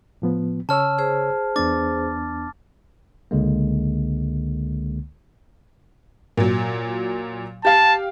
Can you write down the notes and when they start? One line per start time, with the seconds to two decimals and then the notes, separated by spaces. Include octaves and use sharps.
0.22 A2 F3 B3
0.69 C#3 C#5 A5 E6 F6
0.98 G#4 C5
1.56 E2 B3 D4 D6 A6
3.31 C#2 D3 G#3 A#3
6.37 A#2 F#3
7.65 G4 F5 A5